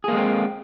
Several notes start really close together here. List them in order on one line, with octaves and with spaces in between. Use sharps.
G#4 A#3 G#3 C4